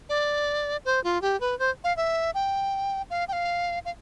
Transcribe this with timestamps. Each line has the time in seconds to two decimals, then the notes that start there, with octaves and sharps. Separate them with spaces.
0.09 D5
0.85 C5
1.04 F4
1.22 G4
1.40 B4
1.59 C5
1.84 F5
1.97 E5
2.35 G5
3.10 F5
3.28 G5
3.33 F5
3.85 F5